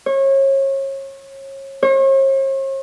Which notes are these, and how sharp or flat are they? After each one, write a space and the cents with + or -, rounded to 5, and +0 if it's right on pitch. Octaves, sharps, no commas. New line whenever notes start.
C#5 -30
C#5 -45